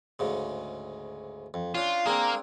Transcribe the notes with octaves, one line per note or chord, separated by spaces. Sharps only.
D2 G#2 C#3
F2
C#4 D4 F4
A#3 C4 D4 G#4 A#4